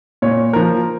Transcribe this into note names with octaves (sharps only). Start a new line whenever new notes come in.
A#2 C#5
F3 A#3 A#4